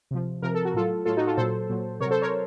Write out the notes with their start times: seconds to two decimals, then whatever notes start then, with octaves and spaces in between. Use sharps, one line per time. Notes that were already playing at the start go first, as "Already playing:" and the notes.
0.11 C3 F3
0.42 C3 F3 A#4
0.54 A4
0.65 F#4
0.74 A2 F#3 F4 A4
1.05 A2 F#3 F4 A4
1.17 D#4 F#4
1.27 F4 A4
1.37 A#2 F#3 A4 C5
1.70 A#2 F#3
2.00 C3 A#4 C#5
2.06 F#3
2.11 A4 C5
2.22 A#4 C#5